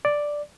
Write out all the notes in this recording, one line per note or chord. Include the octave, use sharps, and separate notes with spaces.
D5